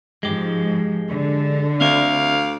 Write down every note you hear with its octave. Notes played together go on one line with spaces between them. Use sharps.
G#2 F3 G#3 G4
D3
D2 C4 E5 F5